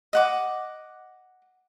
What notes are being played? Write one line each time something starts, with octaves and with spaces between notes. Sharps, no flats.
D#5 F#5 D6